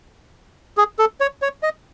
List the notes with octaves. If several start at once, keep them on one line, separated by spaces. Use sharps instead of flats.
G#4
A4
C#5
C#5
D#5